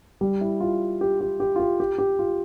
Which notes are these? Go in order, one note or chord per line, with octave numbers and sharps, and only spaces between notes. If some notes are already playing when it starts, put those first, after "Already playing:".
G3
E4
F4
G4
G4
G4
F4
G4
G4
G4
F4